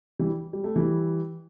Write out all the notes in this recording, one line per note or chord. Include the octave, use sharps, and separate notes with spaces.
E3 G3
G3
A3
E3 G3